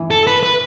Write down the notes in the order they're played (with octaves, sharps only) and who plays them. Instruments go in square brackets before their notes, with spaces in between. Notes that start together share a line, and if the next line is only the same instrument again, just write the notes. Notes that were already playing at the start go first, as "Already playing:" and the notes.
Already playing: [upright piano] E3
[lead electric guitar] A4
B4
B4